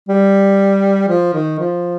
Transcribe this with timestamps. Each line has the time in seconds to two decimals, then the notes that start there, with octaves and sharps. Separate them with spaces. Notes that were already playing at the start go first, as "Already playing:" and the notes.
0.09 G3
1.08 F3
1.34 D#3
1.59 F3